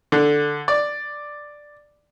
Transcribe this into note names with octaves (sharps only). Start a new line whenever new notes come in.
D3
D5